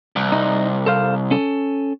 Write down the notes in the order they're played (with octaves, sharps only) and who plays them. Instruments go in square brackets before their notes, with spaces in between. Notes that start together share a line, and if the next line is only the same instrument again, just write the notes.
[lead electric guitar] C2
[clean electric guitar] D#4
A4 C5 F5
C#4 A4